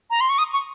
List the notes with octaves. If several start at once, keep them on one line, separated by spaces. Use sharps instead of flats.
A#5
C6
C#6
D#6
C#6